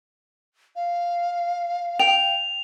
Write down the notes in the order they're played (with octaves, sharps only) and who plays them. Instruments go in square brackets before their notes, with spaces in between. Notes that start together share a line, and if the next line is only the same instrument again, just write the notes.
[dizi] F5
[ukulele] G5 [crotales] F7